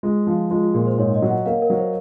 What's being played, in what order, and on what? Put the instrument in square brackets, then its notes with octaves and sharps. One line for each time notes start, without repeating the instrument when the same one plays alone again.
[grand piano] G#3 [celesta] F4
[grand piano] F3
[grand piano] G#3 [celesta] F4
[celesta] F4
[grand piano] A#2 [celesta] G#4
[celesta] C5
[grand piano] G#2 [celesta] C#5
[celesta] D#5
[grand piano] F#3
[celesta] F#5
[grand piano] A#3 [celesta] F5
[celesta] A#4
[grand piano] F#3
[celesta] C5